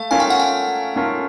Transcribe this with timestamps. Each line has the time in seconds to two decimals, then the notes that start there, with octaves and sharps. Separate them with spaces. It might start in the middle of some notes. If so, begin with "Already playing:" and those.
Already playing: A3 F5
0.11 A3 C#4 F4 A#4 G#5
0.20 G5
0.30 F#5
0.40 G5
0.96 A3 C#4 F4 A#4